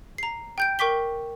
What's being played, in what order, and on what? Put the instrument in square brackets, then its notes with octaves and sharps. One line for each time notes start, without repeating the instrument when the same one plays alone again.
[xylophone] A#5 C7
G5 G6 D7
A#4 G5 C#6 D6 B6 G7